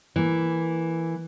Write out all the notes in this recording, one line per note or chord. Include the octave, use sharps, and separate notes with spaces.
E3 A#3